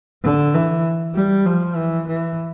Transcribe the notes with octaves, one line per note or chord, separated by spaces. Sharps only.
D3
E3
G3
F3
E3
E3